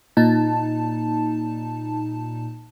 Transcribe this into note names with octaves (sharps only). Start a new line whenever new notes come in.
A#2 D#4 A5